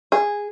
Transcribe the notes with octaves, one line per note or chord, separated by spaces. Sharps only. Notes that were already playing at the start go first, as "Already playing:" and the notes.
G#4